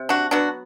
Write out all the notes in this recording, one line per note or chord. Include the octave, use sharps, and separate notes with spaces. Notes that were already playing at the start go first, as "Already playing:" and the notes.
Already playing: C3
D4 F#4
F#3 B3 D4 F#4